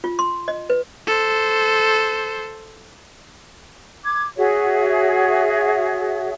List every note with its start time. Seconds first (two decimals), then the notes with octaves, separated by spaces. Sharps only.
0.04 F4
0.19 C6
0.48 D#5
0.70 B4
1.07 A4 C5
4.04 D6 G#6
4.37 F#4 G#4 C#5 E5